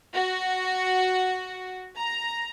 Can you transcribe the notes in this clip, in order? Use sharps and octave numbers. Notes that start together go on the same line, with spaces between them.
F#4
A#5